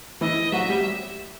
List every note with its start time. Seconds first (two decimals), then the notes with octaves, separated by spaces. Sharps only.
0.21 E3 E4 D#5
0.52 F#3 F#4 E5
0.69 G3 G4